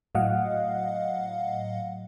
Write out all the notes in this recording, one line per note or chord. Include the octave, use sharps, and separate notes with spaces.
A2 F#3 D#5 F5 F#5